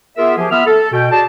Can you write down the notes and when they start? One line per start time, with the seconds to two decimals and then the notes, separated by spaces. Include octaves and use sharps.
0.17 B3 F4 G#4 A#4 E5
0.37 F3 G4 G#4
0.51 B3 F4 E5 B5 E6 F6
0.66 A4
0.92 B2 G5
1.11 F#4 G#4 D5 A5